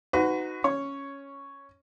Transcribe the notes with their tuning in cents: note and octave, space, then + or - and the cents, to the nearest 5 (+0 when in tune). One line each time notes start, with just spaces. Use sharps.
D#4 +5 F#4 +0 B4 +35
C#4 +0 C#5 +0